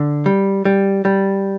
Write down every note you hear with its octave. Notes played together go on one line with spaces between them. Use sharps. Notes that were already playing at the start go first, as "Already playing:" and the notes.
Already playing: D3
G3
G3
G3